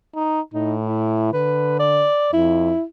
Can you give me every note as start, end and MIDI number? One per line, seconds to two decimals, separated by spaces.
0.15 0.40 63
0.54 1.33 45
0.54 0.74 63
0.86 1.31 64
1.33 2.07 50
1.33 1.78 71
1.79 2.28 74
2.33 2.73 41
2.33 2.83 64